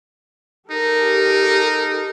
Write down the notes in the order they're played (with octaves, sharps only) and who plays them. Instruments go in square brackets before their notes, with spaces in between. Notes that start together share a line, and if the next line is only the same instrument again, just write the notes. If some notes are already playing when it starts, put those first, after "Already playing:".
[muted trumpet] D#4 [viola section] G4 A4 A#4